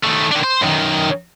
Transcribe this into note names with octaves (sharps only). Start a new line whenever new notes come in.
D#3 A3
D#3 D4
C5
F#2 D#3